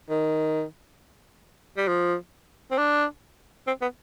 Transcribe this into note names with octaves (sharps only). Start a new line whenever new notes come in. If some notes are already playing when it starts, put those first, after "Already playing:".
D#3
G3
F3
C4
D4
C4
B3